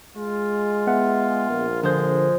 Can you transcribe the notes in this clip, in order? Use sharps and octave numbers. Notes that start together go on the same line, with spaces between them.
G#3 F4
B3 E5 F#5
A#1 A#4
D3 F3 G#3 C5 G6